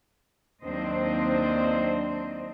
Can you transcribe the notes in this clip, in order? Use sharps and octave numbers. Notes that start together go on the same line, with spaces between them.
D#2 F#3 C4 D4 C5 D#5